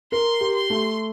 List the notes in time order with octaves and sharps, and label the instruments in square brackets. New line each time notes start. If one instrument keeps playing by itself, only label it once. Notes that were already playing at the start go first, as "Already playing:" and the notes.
[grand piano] A#4 [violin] C6
[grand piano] G4
[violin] C6
[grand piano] A3